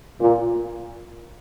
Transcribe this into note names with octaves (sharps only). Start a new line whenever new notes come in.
A#2